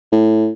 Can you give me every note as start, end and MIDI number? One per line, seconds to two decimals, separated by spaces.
0.12 0.50 45